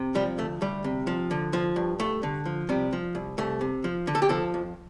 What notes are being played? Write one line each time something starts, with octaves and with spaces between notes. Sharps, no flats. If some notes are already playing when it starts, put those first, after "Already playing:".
Already playing: C3
F3 G3
D2 A3
D2 G3
C3
F3
D3
F3
G2
G2 A3
D3
F3
C3 G3
F3
C2
C2 A3
C3
F3
D3
A4
G4
F3 A4
F2